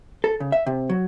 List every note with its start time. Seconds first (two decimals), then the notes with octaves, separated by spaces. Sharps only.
0.24 A4
0.40 C#3
0.52 E5
0.66 C3
0.90 F#3